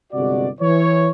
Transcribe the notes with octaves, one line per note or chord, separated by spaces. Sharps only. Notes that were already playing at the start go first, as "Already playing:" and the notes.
G1 C3 G#3 F#4 D5
E3 C#5